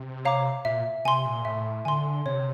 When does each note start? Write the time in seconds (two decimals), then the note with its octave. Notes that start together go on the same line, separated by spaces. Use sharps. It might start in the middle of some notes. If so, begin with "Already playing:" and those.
Already playing: C3
0.25 C#5 F5 A#5 D6
0.65 A#2 E5
1.05 C3 G#5 C6
1.26 A#2
1.45 A2 E5
1.85 D3 G#5 C6
2.26 C3 C#5